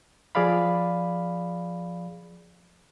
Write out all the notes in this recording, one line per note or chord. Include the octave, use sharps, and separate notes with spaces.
F3 G#4 D5 F5 B5